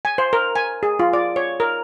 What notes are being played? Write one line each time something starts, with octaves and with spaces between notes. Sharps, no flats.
G#5
C5
A#4
G#5
G#4
F4
D5
C#5
A#4